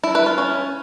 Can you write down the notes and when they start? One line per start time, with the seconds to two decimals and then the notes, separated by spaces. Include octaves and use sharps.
0.04 E4
0.15 B4
0.26 F4
0.38 C#4